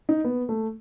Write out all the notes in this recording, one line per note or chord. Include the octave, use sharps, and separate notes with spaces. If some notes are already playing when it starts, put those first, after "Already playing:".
D#4
B3
A3